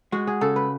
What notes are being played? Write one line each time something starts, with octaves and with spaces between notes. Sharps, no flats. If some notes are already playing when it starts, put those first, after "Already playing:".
G#3 F#4
G#4
C#3 A4
B4